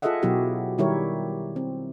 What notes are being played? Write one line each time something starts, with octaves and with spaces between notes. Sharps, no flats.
F4 G#4 A4 D#5 E5 F#5
B2 F#3 B3 E4 F#4 G4
D#3 G3 E4 G4 A#4 C#5
C4